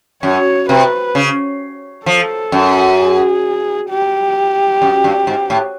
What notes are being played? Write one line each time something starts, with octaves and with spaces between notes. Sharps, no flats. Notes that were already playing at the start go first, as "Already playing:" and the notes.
F#2 C#5
C3 B4
C#3
F3 A4
F#2
G#4
G4
F#2
G2
G#2
A2